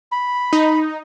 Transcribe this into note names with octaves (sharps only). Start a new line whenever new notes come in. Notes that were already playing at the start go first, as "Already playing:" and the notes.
B5
D#4